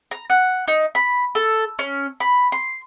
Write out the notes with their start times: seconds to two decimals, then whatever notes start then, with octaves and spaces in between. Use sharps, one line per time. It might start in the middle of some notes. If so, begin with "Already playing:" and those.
0.11 A#5
0.30 F#5
0.68 D#4
0.95 B5
1.35 A4
1.79 C#4
2.20 B5
2.52 C6